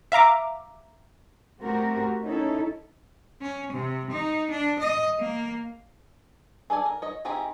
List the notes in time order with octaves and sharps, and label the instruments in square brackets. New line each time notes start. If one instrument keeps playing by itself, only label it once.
[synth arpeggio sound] E5 F5 A#5 D6
[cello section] A3 C4 F#4 G4 A#4
C#4 D#4 E4 A4
[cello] C#4
C3
D#4
D4
D#5
A#3
[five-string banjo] G#4 A4 D5 G#5
A#4
C#5 D#5
C4 D#4 E4 G4 G#4